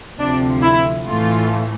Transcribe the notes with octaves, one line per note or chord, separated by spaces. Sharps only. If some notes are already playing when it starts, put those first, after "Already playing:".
D2 C3 F3 D4
E4
A2 E3 A3 F4